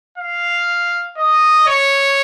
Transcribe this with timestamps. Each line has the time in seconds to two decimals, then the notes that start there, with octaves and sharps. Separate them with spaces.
0.18 F5
1.17 D#5
1.67 C#5